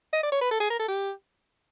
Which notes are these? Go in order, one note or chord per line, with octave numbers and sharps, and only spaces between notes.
D#5
D5
C#5
B4
A4
G#4
A#4
A4
G4